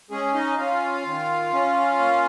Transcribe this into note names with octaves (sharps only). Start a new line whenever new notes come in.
G#3 C#4 G#4
D#4 D#5
C#4 F4 F5
D#3
C#4
A#3